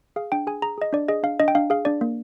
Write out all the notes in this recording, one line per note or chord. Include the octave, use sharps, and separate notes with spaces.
G#4 F5
D4 G5
G#4 G#5
G#4 A#5
G#4 D#5
D4 D5
G#4 D#5
D4 F5
D4 D#5
G5
D4 F5
G#4 F5
D4 D5
A#3